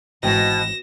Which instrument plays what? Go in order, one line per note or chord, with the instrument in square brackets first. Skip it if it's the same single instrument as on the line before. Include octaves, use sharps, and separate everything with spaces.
[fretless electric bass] G#1 E3 [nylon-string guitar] G#2 G5 [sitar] B2 [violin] A#6 E7